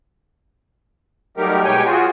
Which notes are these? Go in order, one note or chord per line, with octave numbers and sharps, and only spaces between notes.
F#3 G3 A3 D#4 G4 A#4
B2 G#3 G4 C#5 G5 G#5
F4 F#4 G#4